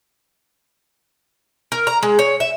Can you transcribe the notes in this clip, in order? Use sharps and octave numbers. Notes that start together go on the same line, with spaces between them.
A#4
A#5
G#3
C#5
E5